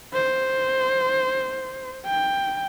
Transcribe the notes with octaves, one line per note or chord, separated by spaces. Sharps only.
C5
G5